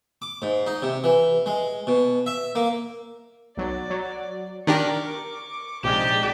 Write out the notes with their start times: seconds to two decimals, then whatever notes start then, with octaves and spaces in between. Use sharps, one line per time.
0.22 D6
0.42 G#2
0.67 D#4
0.82 C3
1.04 E3
1.46 G#3
1.87 B2
2.26 E5
2.55 A#3
3.57 B1 F#3 D5
3.90 F#3
4.67 D#3 D4 G4 A#4 C#6 D6
5.83 A#1 C3 G#3 D#4 G4 D5